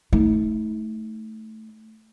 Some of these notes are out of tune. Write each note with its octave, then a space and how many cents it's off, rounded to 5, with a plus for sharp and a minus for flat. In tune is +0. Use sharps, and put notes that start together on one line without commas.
A3 +0 D#4 +45